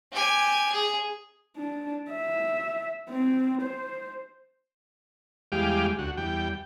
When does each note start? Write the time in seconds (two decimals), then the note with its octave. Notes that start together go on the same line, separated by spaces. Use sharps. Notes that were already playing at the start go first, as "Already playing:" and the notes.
0.12 G4 G#5
0.72 G#4
1.57 D4
2.11 E5
3.10 C4
3.63 C5
5.52 E2 G3 G#3 G4 F5 D6
5.99 D2 F#4
6.17 E2 G3 G5